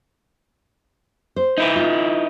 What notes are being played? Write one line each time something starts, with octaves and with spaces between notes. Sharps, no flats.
C5
D#4 E4 B4
F4